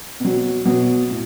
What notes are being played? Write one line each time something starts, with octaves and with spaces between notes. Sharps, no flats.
B2 F#3
B2 F#3
A2